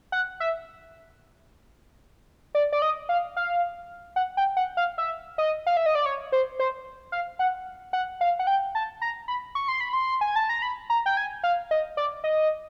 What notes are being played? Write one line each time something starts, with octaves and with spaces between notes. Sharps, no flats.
F#5
E5
D5
D5
D#5
F5
F5
F#5
G5
F#5
F5
E5
D#5
F5
E5
D#5
D5
C#5
C5
C5
F5
F#5
F#5
F5
F#5
G5
A5
A#5
B5
C#6
C6
B5
C6
G#5
A5
A#5
B5
A#5
G5
G#5
F5
D#5
D5
D#5